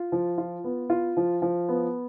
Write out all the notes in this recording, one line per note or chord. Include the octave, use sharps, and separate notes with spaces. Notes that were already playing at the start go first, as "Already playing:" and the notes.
Already playing: F4
F3
F4
B3
F4
F3
F3
B3